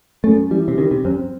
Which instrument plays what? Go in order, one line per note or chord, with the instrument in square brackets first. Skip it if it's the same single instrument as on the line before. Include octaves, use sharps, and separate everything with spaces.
[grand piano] F#2 [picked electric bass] A3
[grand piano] E3 [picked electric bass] G3
[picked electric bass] C3
[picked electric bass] D#3 [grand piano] G3
[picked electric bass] C3
[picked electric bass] F#2 [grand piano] C4